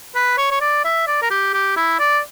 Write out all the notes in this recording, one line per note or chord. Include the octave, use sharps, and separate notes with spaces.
B4
C#5
C#5
D5
E5
D5
A#4
G4
G4
E4
D5